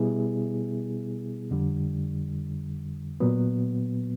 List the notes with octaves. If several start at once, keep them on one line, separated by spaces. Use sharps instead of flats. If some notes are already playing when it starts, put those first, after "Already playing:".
Already playing: B2 G3 B3 E4 G#4
F2 D3 G3
A#2 F#3 B3